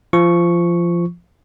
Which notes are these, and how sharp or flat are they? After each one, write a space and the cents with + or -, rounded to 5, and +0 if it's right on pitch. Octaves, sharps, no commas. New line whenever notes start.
F3 -20 C#6 +0